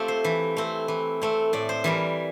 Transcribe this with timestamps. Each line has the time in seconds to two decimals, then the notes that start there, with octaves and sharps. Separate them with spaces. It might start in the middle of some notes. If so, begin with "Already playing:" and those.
Already playing: A3 C4 F4 G4
0.08 C5
0.24 E3
0.57 A3 C4
0.88 E3
1.22 A3 C4
1.53 A2 D5
1.69 C5
1.84 E3 G3 A#4